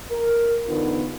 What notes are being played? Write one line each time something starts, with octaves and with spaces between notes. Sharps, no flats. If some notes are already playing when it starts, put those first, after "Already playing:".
A#4
E2 D3 B3 D#4 F4